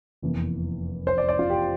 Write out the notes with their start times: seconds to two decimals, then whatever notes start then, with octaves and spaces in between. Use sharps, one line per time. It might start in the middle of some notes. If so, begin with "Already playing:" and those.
0.22 F1 E2 E3 A#3
1.07 C5
1.18 D5
1.29 D5
1.39 F4
1.50 G4